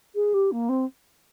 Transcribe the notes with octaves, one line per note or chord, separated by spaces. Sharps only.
G#4
G4
A#3
C4